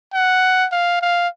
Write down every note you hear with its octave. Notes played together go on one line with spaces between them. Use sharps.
F#5
F5
F5